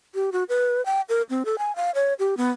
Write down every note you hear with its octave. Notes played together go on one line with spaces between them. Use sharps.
G4
F#4
B4
G5
A#4
C4
A4
G#5
F5
C#5
G4
B3